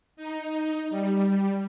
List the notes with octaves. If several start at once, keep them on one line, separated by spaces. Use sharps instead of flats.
D#4
G3